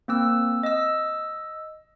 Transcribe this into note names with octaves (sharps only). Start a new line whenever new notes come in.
A#3 C4 E6
D#5 E6